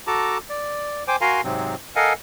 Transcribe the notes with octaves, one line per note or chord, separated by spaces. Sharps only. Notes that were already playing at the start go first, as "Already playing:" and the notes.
F#4 A4 A5 A#5 D6
D5
C5 G5 G#5 D6
F#4 A#4 F5 G#5 A#5 C6
G#2 C3 F#3 C4
A4 A#4 D#5 F5 F#5 G#5